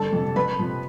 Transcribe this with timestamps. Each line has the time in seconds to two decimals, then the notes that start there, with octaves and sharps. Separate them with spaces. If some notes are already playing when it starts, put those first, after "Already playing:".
Already playing: G1 A4 A5
0.13 F2 C3
0.36 F2 B4 B5
0.59 C3 F3